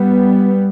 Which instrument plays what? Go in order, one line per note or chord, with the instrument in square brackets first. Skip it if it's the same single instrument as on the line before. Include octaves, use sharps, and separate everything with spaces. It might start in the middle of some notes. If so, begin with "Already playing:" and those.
Already playing: [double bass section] G3 B3